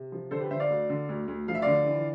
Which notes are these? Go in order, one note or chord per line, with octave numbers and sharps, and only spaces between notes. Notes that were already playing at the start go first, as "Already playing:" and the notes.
Already playing: C3
F3
D3 A4 C5
G4 B4
D3 C5 E5
D5 F5
D2
D3
D2
D2
F3 F5
E5
D3 D5 F5
E3